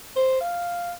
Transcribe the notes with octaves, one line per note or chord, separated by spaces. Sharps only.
C5
F5